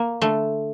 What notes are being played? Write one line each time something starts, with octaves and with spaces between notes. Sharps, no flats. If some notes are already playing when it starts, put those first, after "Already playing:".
Already playing: A#3
D3 A3